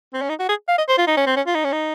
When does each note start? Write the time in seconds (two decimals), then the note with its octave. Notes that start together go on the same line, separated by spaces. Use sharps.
0.14 C4
0.22 C#4
0.29 D#4
0.39 F#4
0.49 G#4
0.68 F5
0.78 D#5
0.88 C5
0.98 F4
1.07 D#4
1.17 C#4
1.26 C4
1.36 C#4
1.47 F4
1.55 D#4
1.64 C#4
1.72 D#4